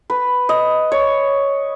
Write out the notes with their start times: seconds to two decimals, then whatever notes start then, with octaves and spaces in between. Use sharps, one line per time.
0.10 B4
0.49 D#5
0.92 C#5